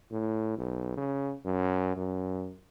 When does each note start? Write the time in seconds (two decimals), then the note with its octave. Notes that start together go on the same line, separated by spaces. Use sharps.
0.11 A2
0.57 B1
0.97 C#3
1.45 F#2
1.97 F#2